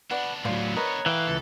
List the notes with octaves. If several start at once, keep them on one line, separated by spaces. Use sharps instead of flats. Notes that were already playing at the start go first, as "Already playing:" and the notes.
B3 D4 F#4 B4 D5
A2 F#3 F4 C5 D5
A#4 B4 C#5 D#5
E3 A3 F5 G5
C#2 A4